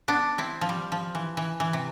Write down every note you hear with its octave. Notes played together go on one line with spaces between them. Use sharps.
B3 D4
C4 E4
F3
G3
F3
E3
E3
E3
C3